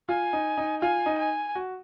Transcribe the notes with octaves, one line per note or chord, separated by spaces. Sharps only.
F4 G#5
D#4
D#4
F4 G#5
D#4
G#5
F#4